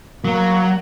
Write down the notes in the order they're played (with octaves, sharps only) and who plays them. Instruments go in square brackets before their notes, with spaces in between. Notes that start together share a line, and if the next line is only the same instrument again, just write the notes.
[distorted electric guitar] F#3 [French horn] A#3